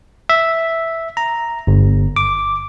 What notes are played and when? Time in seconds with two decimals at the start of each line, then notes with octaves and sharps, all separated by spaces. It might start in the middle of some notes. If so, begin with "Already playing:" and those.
0.29 E5
1.17 A#5
1.67 G1
2.16 D6